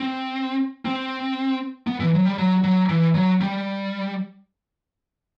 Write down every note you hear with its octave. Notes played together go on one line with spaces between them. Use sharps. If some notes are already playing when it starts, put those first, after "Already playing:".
Already playing: C4
C4
B3
E3
F#3
G3
F#3
F#3
E3
F#3
G3